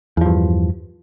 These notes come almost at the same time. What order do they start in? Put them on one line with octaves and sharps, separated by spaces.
E2 F3 G2